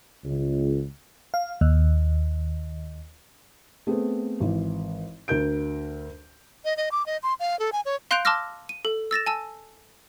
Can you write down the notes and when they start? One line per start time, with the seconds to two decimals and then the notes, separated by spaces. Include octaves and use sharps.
0.25 C#2
1.34 F5
1.61 D#2
3.87 A3 B3 C4 G#4
4.40 G#1 E3
5.28 D2 A#4 G6 D7
6.65 D#5
6.77 D#5
6.92 D6
7.06 D#5
7.23 C6
7.40 F5
7.59 A4
7.73 G#5
7.85 C#5
8.11 F5 C6 F#6 G6 D7 F7
8.25 A5 C6 D6 E6 F6 A#6
8.69 D#7
8.85 A4
9.11 E6 A6 A#6 E7
9.26 G#5 A5 E6